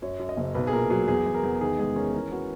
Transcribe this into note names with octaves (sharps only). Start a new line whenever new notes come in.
F#2 C#5
F#2
D#5
F#1
B1 B4
G#4
A#2 A#4
F#3 G#4
E2 G#4
E2
A#4
E2
D#3 G#4
G#3 G#4
C#4 A#4
E3 A#4
B3 F#4